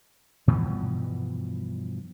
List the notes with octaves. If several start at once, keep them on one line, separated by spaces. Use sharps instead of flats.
G2 B2 E3 F3